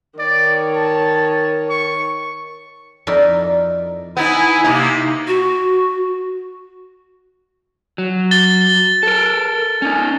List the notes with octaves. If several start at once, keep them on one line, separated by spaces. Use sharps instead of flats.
D#3 C#5 D5
A5
C#6
F2 D#4 E4 A#4 D5
B3 D#4 E4 G#5
C3 A#3 D#4
F#4
F#3
A6 G7
A4 A#4
C#4 D#4